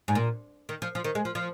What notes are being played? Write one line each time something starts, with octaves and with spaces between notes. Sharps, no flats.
G#2
A#2
D#3
F3
F3
D#3
G#3
F3
F3